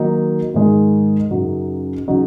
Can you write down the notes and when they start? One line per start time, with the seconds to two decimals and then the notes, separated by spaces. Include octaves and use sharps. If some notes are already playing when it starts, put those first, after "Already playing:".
Already playing: D#3 F#3 A#3 D#4
0.54 G#2 D#3 G#3 D#4
1.31 F#2 C#3 F#3 D#4 F#4
2.08 C#3 F#3 D#4 F#4